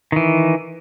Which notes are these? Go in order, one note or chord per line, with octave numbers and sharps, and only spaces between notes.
D#3 E3